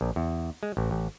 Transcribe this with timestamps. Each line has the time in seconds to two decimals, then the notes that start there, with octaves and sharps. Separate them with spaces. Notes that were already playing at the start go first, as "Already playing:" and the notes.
0.01 A#1
0.16 E2
0.63 G#3
0.77 A1
0.91 A1